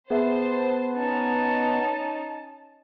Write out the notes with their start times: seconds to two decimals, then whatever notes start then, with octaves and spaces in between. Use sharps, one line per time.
0.10 B3 G#4 C5 E5 A5
0.97 C#4 D#4 A5